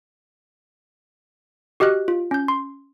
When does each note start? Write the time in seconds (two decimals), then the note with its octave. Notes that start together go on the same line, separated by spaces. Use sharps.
1.80 F#4 G4 D#5 F6 F#6
2.08 F4
2.31 C#4 G6
2.48 C6